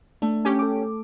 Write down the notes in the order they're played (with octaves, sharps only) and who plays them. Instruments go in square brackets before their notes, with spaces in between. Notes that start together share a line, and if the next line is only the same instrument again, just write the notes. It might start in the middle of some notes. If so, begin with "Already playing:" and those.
[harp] A3 [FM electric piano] D4
[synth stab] C#4 G4
[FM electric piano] A4 D6